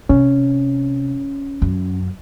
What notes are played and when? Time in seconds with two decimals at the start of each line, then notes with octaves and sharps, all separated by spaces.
0.09 C3 C#4
1.62 F#2